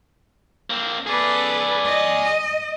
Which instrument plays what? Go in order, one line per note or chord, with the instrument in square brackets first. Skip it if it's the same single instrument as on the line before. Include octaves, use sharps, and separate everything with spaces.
[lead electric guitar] A#3 C4
[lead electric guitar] G#4 D5 [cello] A4 B4
[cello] D#5